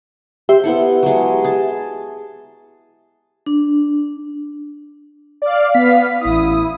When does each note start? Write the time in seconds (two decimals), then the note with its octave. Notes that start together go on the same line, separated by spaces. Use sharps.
0.49 G4 C5 E5
0.64 B3 E4 A4
1.03 F#3 G#3
1.44 G#4 A5
3.47 D4
5.42 D5 F5
5.74 B3 F5 B6
6.21 A1 E4 D#6